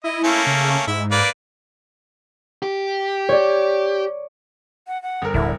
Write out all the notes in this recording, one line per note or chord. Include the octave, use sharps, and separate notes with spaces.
E4 D#5
A3 A#3 C#4
C#3
G#2 E4 E5
A#3 B4 D5
G4
C#5 D5
F#5
F#5
G1 A#4
D1 D3 E4